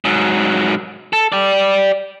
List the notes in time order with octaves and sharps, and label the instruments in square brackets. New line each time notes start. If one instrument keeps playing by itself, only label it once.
[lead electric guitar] G#2 F#3
A4
G4 D5